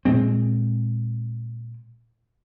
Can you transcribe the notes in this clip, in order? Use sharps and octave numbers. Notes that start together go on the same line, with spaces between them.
A#2 G#3 C4